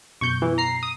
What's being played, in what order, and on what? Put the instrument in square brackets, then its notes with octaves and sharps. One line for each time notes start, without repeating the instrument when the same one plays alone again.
[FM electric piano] F#2 B2 [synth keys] C#6 G6
[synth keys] E3
A#5 C7
D#6